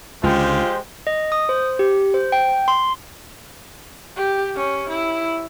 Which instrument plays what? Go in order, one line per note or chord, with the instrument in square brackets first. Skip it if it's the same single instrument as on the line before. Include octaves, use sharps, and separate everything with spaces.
[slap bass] C#2 D3 [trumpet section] G#3 G4 G5 [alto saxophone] F4 [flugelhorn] C5
[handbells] D#5
D#6
C5
G4
C5
G5
C6
[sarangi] G4
C#4
E4